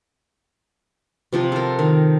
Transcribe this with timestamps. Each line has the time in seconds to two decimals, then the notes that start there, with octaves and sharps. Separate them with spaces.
1.33 C3 F3 G4
1.52 A4 A#4
1.79 D#3